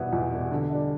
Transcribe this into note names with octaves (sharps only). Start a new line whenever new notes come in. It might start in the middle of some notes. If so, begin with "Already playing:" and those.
Already playing: E2 B2 G3 B3 E4
E2
B2 G3 B3 E4
D3
G3 D4